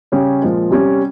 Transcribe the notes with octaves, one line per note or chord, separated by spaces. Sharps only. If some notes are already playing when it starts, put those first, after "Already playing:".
C#3 G3 C#4 G4 C#5
A#2 F3 G#3
C3 G3 C#4